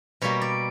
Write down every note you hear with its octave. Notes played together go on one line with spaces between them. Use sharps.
B2 G3 A#3 C#5
D5